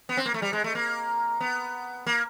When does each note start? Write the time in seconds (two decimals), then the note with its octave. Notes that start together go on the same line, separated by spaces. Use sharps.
0.09 B3
0.17 C4
0.26 A#3
0.34 A3
0.42 G3
0.53 G#3
0.64 A3
0.75 A#3
1.40 B3
2.07 A#3